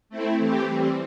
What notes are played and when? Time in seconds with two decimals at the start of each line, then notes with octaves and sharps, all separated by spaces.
0.09 A3 C4 E4
0.38 E3 A3 C4 G4
0.66 E3 G3 C4